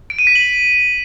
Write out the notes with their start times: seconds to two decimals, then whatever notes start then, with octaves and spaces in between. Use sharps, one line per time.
0.10 D7
0.19 D#7
0.27 B6
0.35 F#7